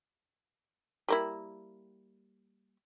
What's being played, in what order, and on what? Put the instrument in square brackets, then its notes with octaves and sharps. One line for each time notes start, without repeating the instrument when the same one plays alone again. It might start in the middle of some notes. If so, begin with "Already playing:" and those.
[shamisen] G3 A#3 E4